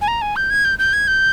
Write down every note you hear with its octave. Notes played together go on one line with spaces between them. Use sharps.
G#5
A#5
G#5
G6
G#6
G6
G6
G#6
G6